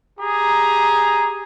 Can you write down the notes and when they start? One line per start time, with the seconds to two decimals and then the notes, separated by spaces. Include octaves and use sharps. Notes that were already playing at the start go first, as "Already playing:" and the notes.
0.20 G4 G#4 A#5